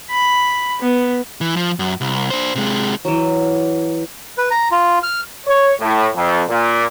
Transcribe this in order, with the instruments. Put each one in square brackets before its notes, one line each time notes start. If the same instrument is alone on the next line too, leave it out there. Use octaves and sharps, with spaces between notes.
[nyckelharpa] B5
B3
[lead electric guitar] E3
F3
F#2
C2
D4 C5
C3 G#3
[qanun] E3 F#3
[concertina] B4
A#5
F4
F6
[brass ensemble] C#5
A2
F2
A#2